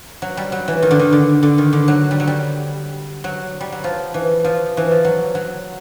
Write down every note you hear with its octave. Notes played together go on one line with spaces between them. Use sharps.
F#3
G3
F#3
E3
D#3
D3
D#3
D3
D3
D#3
D3
F#3
G3
F#3
G3
F#3
G3
F#3
F3
E3
F3
E3
F3
F#3
F#3